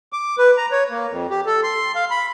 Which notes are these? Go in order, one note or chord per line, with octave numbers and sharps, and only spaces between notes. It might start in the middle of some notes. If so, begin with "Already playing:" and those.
D6
B4
A#5
C#5
A#3
F2
G4
A4
C6
F5
B5